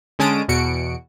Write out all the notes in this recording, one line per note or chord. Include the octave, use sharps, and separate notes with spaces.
D3 G#3 C#4 A5 D#6 D7
E2 B2 F#4 C#7 D7